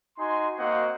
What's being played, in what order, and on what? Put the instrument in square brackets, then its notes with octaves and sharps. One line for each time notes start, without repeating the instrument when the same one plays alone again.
[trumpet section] D#4 F#4 G#5 C6
A#3 C4 F#4 C5 D#5 F#5